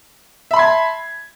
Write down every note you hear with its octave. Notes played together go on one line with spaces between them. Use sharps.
E5 A5 B5 C6 G#6